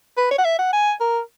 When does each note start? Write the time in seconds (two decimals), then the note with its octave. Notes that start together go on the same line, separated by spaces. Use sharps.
0.17 B4
0.31 C#5
0.38 F#5
0.44 E5
0.58 F#5
0.73 G#5
1.00 A#4